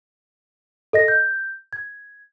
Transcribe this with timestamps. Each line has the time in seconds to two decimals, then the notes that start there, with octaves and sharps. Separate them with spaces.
0.93 A4 D#5 A#6
1.08 G6
1.73 G#6